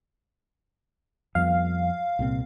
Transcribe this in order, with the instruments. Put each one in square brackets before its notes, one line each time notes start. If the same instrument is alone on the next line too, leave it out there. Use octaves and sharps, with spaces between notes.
[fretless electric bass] F2 G3 B3 [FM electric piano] F5
[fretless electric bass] C2 A#2 C4